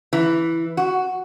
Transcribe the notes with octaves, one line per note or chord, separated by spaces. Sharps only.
E3
F#4